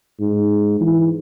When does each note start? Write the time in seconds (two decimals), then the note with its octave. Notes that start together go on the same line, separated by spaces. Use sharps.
0.20 G#2
0.80 E3